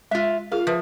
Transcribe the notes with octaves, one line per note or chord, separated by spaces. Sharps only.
G#3 F4 E5
F4 G#4 A#4 F5
F3 B4 E5